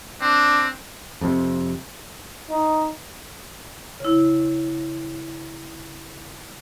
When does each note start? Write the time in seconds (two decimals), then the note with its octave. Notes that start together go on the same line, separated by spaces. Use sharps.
0.21 C4 D4
1.21 F2 C3
2.50 D#4
4.00 C#3 E4